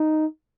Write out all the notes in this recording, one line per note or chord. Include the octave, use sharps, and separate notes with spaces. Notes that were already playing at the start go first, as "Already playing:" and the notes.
Already playing: D#4